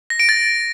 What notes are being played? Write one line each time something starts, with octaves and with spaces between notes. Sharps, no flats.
A#6
D7
A6